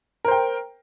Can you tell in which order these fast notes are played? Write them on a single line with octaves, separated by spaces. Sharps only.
A#4 C5 G5